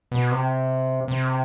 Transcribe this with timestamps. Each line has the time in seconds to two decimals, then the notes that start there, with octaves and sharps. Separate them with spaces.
0.12 B2
0.31 C3
1.08 C3